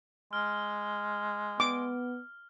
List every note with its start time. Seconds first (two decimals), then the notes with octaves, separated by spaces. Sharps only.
0.33 G#3 F6
1.60 B3 D6